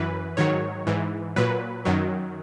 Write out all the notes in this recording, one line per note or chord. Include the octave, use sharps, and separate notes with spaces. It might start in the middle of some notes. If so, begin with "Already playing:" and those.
Already playing: F#2 E3 B4
G#2 D#3 F#3 C#5
G#2 E3
A#2 F#3 B4
F#2 D#3 F#3